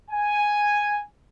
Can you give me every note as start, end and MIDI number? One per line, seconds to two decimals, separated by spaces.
0.11 1.01 80